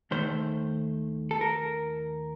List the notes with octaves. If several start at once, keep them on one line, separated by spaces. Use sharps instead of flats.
D#2 D#3 A3 C5
A4
A#4